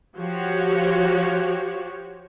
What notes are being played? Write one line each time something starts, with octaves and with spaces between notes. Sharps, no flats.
F3 F#4 G4 C#5